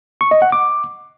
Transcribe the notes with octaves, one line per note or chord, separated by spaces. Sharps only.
C#6
D#5
F#5
D6